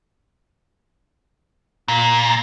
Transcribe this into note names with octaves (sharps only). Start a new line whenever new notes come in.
A#2